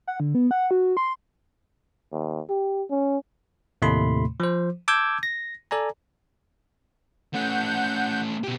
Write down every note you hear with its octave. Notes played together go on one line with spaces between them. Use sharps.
F#5
D3
B3
F#5
F#4
C6
D#2
G4
C#4
D#2 A2 C3 A3 B5 C6
F3 C5
A5 D6 E6 G6 G#6
A#6
A4 D5 G#5 A#5
A3 C#4 F#5 G6
B2 G4